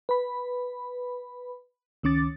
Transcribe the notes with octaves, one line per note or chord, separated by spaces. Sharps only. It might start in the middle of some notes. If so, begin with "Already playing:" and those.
B4 B5
C#2 D#3 C#4 D6 A6